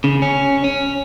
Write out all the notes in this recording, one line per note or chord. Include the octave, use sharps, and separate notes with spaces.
C#3
C#4
C#4